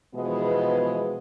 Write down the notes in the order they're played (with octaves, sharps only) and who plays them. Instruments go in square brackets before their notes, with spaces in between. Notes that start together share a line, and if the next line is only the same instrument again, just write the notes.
[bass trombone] B2 [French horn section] E3 F3 G#3 [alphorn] B3